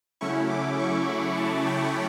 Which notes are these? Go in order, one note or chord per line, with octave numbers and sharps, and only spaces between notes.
C#3 F#3 A3 C#4 E4 C#6
D6
C#6
B5
A5
G5